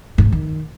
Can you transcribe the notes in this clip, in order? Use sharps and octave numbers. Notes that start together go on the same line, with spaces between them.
G2
G#2
D#3